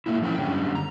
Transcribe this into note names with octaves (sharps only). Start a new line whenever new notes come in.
A3 A#3 E4
F3 C#4 E4 G5
F#2 D3 G3 C#4
A#5